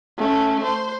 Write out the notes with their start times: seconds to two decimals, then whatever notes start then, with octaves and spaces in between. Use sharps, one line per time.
0.18 A3 C#4
0.64 C5